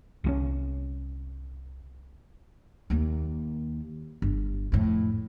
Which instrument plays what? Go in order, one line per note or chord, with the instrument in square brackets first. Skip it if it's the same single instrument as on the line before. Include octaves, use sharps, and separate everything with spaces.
[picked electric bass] C2 G3 C#4
[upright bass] D#2 A#3
G1
F2 A2